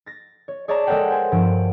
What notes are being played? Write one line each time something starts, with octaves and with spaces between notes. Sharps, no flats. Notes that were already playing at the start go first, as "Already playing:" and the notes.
A6 A#6
C#5
G#4 C#5 D5 E5 A5 A#5
G#3 A4 A#4 C#5 F#5 G5
C5 G#5
G2 F3 F#5 D7